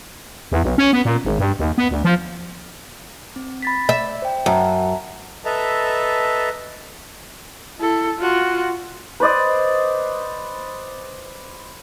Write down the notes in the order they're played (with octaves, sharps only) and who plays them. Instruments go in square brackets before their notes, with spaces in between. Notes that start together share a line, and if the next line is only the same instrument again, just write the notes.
[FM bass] E2
B1
C#4
B3
A#2
G#1
G2
D#2
B3
D2
F3
[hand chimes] C4
B5 A6 B6
[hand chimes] D5 [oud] E5
[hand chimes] C5 G5
[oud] F#2 [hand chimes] F#5 A5 A#5
[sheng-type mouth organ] A4 B4 D#5 E5 A5 A#5
[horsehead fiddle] E4 A4
F4 F#4
[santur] B4 C5 D5 D#5